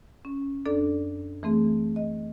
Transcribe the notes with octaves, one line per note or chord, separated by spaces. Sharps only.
C#4
F#2 D4 A4 D5
E3 A3 C4 G#4
D#5